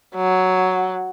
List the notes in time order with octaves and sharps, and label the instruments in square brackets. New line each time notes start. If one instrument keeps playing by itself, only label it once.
[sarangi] F#3